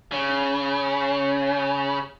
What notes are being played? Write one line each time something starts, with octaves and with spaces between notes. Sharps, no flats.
C#3